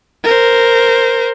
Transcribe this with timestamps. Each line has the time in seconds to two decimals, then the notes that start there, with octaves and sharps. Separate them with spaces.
0.24 A#4 C5